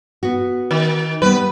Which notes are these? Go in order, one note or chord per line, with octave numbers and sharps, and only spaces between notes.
B3 F#4
D#3
G3 A#3 B3 B4